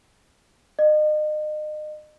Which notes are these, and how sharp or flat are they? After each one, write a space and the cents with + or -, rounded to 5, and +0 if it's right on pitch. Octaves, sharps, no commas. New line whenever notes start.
D#5 -35